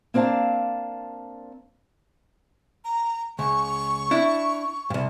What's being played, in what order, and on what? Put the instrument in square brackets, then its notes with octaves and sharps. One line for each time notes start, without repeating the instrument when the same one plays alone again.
[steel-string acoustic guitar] A#3 C4 D4 F5 A5
[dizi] A#5
[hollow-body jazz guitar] C#2 [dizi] C#6
[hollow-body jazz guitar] D4 E4
C2 G2